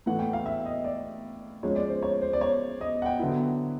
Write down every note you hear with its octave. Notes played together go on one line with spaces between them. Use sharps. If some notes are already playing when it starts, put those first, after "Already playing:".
A2 E3 A3 F#5
G5
F5
E5
D#5
D5
F3 G#3 C#4 F4 C#5
D5
C5
C#5
C5
D5
C#5
D#5
F#5
G5
D3 F#3 B3 E4